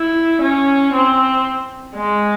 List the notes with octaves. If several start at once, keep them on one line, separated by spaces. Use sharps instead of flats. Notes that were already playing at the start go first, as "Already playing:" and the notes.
Already playing: E4
C#4
C4
G#3